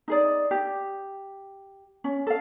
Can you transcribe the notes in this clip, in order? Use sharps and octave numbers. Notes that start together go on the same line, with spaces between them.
D#4 G#4 D5
G4
C#4
A4 F5